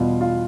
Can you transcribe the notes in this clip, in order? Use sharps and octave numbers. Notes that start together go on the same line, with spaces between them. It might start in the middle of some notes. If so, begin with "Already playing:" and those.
Already playing: E2 B2 G3 F4
F4